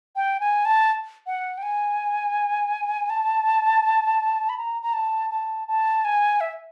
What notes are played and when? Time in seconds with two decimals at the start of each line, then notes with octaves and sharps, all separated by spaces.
0.16 G5
0.40 G#5
0.65 A5
1.27 F#5
1.58 G5
1.63 G#5
3.10 A5
4.49 B5
4.58 A#5
4.82 A#5
4.93 A5
5.30 A5
5.68 A5
6.05 G#5
6.41 E5